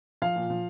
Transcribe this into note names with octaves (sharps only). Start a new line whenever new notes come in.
F3 F5
A#2
F3